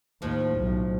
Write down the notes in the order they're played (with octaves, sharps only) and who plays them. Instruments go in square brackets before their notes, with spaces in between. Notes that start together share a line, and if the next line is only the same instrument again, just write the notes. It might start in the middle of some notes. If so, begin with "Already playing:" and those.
[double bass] D#2 [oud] A2 F3
[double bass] B1